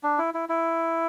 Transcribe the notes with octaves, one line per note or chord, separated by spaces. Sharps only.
D4
E4
E4
E4